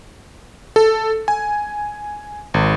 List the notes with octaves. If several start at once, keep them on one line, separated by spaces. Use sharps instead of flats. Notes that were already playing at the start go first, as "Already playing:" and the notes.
A4
G#5
G#1